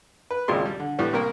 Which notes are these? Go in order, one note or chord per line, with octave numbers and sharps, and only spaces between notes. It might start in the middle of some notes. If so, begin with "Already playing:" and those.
B4
G#1 C#2 A#2 G#3 C6
G3
D3
A2 E3 G3 B3
C2 A#3 A#4